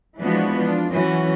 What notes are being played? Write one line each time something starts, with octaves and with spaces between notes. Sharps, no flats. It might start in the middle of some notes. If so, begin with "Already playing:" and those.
E3 F3 G#3 B3 D4 F#4
D4 F4
E3 F#3 C#4 F#4